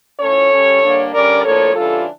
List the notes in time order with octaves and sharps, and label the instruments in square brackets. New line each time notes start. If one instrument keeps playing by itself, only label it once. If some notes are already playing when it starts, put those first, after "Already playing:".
[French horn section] A2 F3 A3 C#4 A4 C#5
C#3 G3 C#4
D3 G3 A#3 D4
D3 G3 C#4 A#4 D5
A2 F3 A#3 D4 A4 C#5
C#3 E3 G3 D4 F4 A4